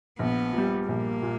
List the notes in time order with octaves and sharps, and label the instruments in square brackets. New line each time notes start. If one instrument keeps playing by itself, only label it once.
[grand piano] A#1 [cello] B3
[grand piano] A#2 G3
[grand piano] A#1 [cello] A#3
[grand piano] A#2